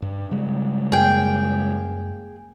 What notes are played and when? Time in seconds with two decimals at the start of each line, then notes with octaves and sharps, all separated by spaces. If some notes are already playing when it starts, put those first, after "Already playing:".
0.02 G2
0.31 C#3 G3 G#3
0.92 F#2 A#3 G#4 G5